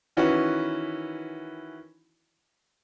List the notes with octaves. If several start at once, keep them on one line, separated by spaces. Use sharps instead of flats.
D#3 E3 C#4 E4 F#4 B4